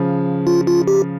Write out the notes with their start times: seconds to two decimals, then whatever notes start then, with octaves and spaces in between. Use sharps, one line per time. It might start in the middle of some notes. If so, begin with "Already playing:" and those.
Already playing: C#3 F3
0.47 F4
0.67 F4
0.88 G4